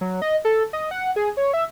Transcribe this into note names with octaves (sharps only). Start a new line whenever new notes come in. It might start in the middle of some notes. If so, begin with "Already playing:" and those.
F#3
D#5
A4
D#5
F#5
G#4
C#5
E5